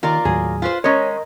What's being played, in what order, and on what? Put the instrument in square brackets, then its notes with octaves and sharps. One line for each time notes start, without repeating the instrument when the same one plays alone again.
[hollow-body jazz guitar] D#2 [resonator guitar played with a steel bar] F4 A#4 D5
[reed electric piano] D#2 A2 F#3 [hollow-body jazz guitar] G#4
[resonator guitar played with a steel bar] F4 B4 C5
[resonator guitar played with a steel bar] G#3 C#4 [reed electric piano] A#4 D#5 A#5 [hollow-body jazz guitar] C#5